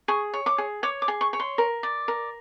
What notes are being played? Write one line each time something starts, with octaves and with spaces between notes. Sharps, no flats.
G#4 C#6
C#5
D6
G#4
C#5 D6
D6
G#4
C#6
C#5
C6
A#4
D5
A#4